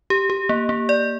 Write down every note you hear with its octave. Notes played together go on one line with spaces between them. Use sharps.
G4
G4
A#3
A#3
D5